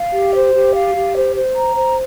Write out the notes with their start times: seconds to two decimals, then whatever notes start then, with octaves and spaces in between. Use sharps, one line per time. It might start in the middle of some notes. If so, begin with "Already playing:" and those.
Already playing: F5
0.13 G4
0.34 C5
0.54 G4
0.74 F5
0.95 G4
1.15 C5
1.35 C5
1.55 A#5
1.75 C5